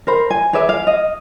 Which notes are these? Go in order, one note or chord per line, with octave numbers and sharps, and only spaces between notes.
A#4 C5 B5
G#5
G#4 B4 D5 E5
F5
D#5